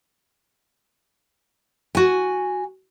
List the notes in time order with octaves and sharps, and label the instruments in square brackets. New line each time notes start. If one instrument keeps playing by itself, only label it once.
[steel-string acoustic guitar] F#4 G#5